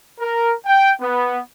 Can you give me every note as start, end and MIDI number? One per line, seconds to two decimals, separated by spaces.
0.20 0.54 70
0.66 0.92 79
1.02 1.40 59